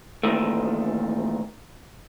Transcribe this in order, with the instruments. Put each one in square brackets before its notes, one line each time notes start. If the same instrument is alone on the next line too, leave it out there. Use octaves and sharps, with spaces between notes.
[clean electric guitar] E2 A#2 D#3 A3